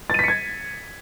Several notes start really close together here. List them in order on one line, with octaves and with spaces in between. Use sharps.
A6 D#7 B6 C#7 G#6